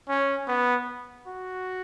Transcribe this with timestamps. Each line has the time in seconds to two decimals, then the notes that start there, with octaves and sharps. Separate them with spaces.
0.08 C#4
0.48 B3
1.27 F#4